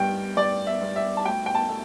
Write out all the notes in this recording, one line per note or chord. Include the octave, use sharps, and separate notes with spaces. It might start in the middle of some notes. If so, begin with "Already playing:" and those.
Already playing: G2 G3 G5
G2 D5
E5
G2
E5
A5
D2 G5
G5
A5
A3